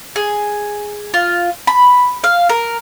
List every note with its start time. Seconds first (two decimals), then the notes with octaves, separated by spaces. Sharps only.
0.16 G#4
1.14 F4
1.67 B5
2.24 F5
2.49 A#4